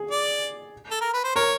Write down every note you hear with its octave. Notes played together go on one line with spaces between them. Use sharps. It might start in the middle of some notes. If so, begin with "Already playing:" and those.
Already playing: G#4
D5
A4
A#4
B4
C5
A#4 C#5